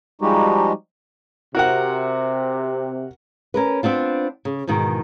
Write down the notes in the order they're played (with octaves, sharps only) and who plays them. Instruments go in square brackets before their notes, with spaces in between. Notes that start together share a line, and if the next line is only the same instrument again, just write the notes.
[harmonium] F3 G3 G#3 D#4 F#4 G4
[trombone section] C3 [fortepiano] F#4 A#4 F#5
[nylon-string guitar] C#4 A#4 B4
B3 C4 D4 F4
C#3
E2 G#2 B2 D#3